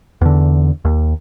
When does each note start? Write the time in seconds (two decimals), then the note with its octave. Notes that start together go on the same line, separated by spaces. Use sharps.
0.21 E2 D3
0.85 D#2